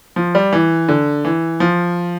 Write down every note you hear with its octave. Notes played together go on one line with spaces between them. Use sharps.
F3
G3
E3
D3
E3
F3